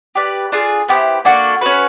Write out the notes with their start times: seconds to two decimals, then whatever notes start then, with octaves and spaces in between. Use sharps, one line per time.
0.15 G4 B4 D5
0.52 D4 F4 G#4
0.88 B3 E4 G4 C5
1.25 A#3 D4 F#4 A4
1.61 C#4 F#4 B4